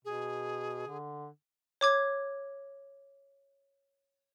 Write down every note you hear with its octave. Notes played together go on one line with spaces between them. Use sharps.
B2 G#4
D3
C#5 D6 G#6